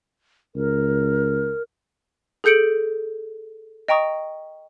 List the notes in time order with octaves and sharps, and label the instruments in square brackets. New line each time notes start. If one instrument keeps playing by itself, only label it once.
[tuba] C#2 [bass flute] A#4
[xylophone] G#4 A4 G6 C#7 D7 F#7
D#5 G5 A#5 C#6 D#6